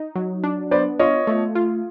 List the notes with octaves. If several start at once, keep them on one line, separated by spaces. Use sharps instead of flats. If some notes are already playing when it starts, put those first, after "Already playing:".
Already playing: D#4
F#3
D4
B3 C5 D5
F4 C#5 D#5
A3
F4